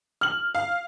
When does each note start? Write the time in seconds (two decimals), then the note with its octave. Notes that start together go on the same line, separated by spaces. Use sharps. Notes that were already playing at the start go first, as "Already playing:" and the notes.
0.21 F6 F#7
0.55 F5